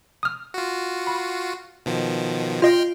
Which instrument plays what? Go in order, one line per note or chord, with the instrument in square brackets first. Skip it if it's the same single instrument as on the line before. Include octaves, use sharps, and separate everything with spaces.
[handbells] D#6 F6
[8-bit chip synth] F4 F#4
[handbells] B5
[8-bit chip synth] B2 D#3 F3
[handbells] F4 D#5 [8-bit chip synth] G5 C6 F6